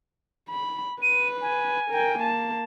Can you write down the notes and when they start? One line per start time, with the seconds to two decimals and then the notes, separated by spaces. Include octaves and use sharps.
0.49 B5
1.02 B4 D#7
1.42 G#5
1.91 A#4 G5
2.19 A#3 A5